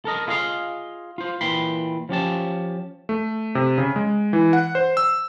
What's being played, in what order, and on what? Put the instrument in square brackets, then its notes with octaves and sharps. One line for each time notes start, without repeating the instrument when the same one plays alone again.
[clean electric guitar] A4 A#4 D#5
E4 F4 G#4 D#5 F5 C6
F4 C5
A#2 E3 G5 B5 C6
F3 C#4 G4 A5
[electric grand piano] A3
C3
C#3
G#3
E3
F#5
C5
E6